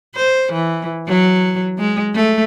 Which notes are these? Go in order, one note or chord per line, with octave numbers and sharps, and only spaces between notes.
C5
E3
F#3
G#3
A3